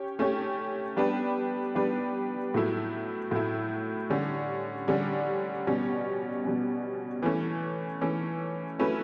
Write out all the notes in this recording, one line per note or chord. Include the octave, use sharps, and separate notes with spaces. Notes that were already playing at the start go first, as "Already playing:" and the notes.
Already playing: C#4 G4 C#5
A3 C#4 G4 C#5
G3 B3 D4 G4 B4
G3 B3 D4 G4 B4
A2 F#3 A3 E4
A2 F#3 A3 E4
D3 G3 C#4
D3 G3 C#4
B2 G3 C#4
B2 G3 C#4
E3 A3 C#4
E3 A3 C#4
F#3 A3 C#4 E4 B4